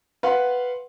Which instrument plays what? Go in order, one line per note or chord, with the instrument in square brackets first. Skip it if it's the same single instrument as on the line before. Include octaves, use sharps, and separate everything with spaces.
[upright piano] B4 F5 F#5 C6